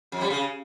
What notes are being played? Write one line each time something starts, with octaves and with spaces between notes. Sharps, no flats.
F2
G3
C#3